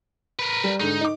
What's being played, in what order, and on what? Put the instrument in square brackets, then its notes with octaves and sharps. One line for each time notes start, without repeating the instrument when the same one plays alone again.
[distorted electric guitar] A#4 B4
[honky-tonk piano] G3
[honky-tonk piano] G#2 D3 [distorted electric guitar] D#4
[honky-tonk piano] D#4 D6